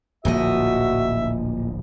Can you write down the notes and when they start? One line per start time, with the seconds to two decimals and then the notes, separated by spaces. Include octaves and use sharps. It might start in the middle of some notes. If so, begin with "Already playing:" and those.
0.25 D1 A#1 A#2 F3 F#4 D#5 E5